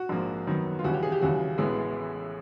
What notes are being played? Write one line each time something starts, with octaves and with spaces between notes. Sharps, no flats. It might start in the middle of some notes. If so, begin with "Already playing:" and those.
Already playing: F#4
A#1 G#2 F3 A#3
F#2 D#3 F#3 B3
F4
D#2 C#3 E3 G3 F#4
G4
G#4
G4
D#2 C#3 E3 G3 F#4
A1 A2 E3 G#3 B3